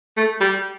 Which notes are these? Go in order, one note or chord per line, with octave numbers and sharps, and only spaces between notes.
A3
G3